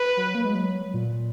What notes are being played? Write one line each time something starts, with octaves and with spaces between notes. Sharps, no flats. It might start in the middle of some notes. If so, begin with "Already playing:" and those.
Already playing: B4
F#3
A#3
G#3
F#3
A#2